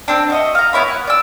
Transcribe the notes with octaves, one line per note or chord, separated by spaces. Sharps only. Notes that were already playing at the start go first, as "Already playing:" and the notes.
C4 D4
F#4 D#5 E5
F5 A#5
B3 E4 C#5 B5
B3 F#6
D5 E6